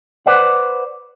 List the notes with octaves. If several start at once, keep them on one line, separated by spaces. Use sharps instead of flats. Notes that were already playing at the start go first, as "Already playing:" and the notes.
B4 C5 D5 F#5